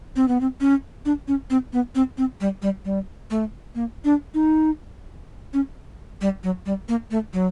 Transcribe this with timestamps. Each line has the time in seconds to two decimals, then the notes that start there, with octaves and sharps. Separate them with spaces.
0.16 C4
0.28 B3
0.41 C4
0.61 C#4
1.05 D4
1.28 C#4
1.50 C4
1.73 B3
1.95 C4
2.18 C4
2.41 G3
2.62 G3
2.85 G3
3.31 A3
3.75 A#3
4.05 D4
4.34 D#4
5.53 C#4
6.21 G3
6.43 F#3
6.66 G3
6.89 A#3
7.11 A3
7.33 F#3